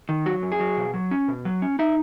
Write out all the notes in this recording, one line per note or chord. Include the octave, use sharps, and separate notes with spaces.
D#3
F#3 F#4
F#2
G#4
F#3
B2
F#3
C#4
B2
F#3
C#4
D#4 E5